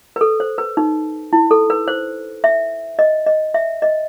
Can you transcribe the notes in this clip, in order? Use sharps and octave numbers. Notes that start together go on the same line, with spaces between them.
B4
A4
C5
B4
D#4
E4
A4
B4
C5
E5
D#5
D#5
E5
D#5